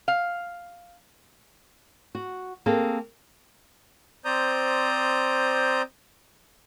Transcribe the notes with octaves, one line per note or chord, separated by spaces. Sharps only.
F5
F#4
A#3 C4 G#4 A4
C4 C5 D5 A#5 D#6 G6